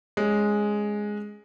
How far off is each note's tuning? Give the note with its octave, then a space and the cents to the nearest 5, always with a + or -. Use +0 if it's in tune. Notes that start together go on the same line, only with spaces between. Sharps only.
G#3 +0 C#4 +0